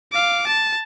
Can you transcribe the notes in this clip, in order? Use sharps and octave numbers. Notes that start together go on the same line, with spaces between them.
F5 D6
A5